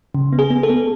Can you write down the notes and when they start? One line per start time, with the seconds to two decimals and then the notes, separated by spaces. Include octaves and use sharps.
0.15 C#3
0.33 B3
0.39 G#4
0.50 B3
0.63 A4
0.70 B3